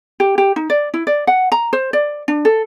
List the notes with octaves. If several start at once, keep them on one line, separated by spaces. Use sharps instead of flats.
G4
G4
D#4
D5
E4
D5
F#5
A#5
C5
D5
D4
A4